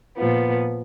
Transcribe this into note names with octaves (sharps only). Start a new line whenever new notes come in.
A#2 F3 B3